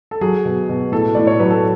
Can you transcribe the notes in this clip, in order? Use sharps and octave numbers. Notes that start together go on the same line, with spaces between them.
A4
F#3 G#4
B2
B2
A2 A4
A2 D5
C#5
F#3 B4
A4